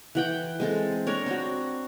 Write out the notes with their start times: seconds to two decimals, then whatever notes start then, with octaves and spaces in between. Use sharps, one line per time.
0.15 E3 F#5 G5
0.60 G#3 C4 A4
1.07 D4 A#4 C#5
1.26 C4 F#4